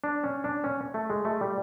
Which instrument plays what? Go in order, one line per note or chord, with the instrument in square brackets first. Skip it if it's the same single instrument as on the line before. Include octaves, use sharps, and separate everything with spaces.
[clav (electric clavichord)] D4
C#4
D4
C#4
A3
G#3
A3
G3